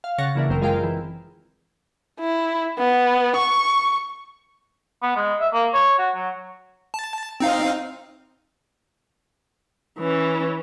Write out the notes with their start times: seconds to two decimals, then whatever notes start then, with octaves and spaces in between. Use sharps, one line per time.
0.04 F5
0.18 C#3 C#5 F#5 A6 A#6 C#7
0.35 C#3 E3 A#3 D4 E4
0.48 G1 F#2 C4 A#4
0.61 G#3 F4 G#4 A#4 F5 G5
0.83 E3
2.20 E4
2.78 B3
3.37 C#6
5.02 B3
5.16 G#3
5.40 E5
5.53 A#3
5.74 C#5
5.98 F#4
6.15 F#3
6.94 A5
7.40 C4 D#4 F5
9.99 E3 C#4